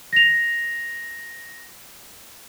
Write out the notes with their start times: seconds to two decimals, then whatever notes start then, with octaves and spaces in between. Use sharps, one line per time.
0.13 A#6 F7